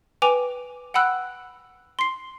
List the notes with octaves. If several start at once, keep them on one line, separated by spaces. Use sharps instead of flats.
B4 G5 G#5 D6 F7
F#5 G5 B5 E6 F#6
C6 C7